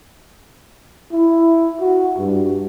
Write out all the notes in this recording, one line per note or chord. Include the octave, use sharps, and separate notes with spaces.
E4
F#4
G2